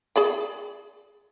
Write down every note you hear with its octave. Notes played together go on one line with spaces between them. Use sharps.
G#4 D5 G5